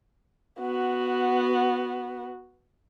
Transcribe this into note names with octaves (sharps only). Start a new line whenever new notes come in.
B3 F#4